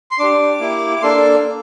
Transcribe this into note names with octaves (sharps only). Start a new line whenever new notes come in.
C6
D4 G4 D6
A#3 E4 G4
D6
A#3 D4 A4 C6